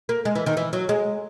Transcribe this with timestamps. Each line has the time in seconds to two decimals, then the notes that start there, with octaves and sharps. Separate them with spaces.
0.09 A#3
0.25 G#3
0.35 E3
0.46 D#3
0.57 E3
0.73 F#3
0.89 G#3